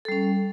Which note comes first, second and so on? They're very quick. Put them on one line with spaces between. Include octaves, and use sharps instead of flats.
A4 G3 C#4